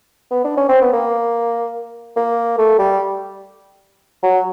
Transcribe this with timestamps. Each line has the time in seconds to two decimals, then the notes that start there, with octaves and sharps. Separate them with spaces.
0.31 B3
0.44 D4
0.57 C#4
0.69 C4
0.81 B3
0.93 A#3
2.16 A#3
2.58 A3
2.79 G3
4.23 F#3